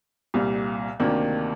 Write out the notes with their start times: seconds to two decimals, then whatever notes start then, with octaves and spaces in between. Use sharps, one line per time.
0.34 C2 A#2 G3
1.00 D2 C3 D#3 A#3 D4